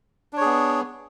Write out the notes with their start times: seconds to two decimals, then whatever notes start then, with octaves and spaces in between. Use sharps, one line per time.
0.33 D4
0.37 C#5
0.41 G#4
0.45 B3